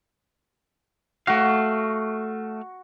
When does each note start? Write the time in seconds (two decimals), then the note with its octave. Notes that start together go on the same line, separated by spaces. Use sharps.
1.27 A3 F#4 F5